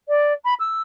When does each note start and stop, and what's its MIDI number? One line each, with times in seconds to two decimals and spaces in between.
0.08 0.33 74
0.44 0.54 83
0.59 0.82 88